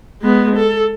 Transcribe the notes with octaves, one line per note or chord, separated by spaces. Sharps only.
G#3 B3
A4